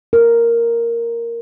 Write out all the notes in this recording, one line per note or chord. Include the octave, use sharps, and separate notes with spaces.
A#4